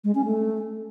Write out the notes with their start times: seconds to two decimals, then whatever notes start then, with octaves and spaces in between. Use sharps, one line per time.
0.04 G#3
0.15 C#4
0.26 A3